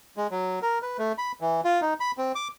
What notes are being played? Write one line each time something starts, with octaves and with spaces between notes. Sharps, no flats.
G#3
F#3
A#4
B4
A3
B5
E3
F4
D#4
B5
C4
D6